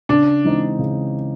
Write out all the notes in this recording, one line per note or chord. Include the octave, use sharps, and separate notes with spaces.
C#3 D4
E3 G#3 C4 D#4
C#3